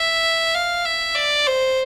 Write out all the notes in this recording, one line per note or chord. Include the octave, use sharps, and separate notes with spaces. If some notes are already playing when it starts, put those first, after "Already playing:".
Already playing: E5
F5
E5
D5
C5